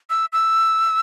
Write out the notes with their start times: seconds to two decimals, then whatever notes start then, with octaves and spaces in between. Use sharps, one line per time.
0.10 E6
0.33 E6